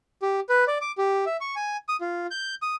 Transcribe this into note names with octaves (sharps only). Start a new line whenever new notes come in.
G4
B4
D5
D6
G4
E5
C#6
G#5
D#6
F4
G6
D#6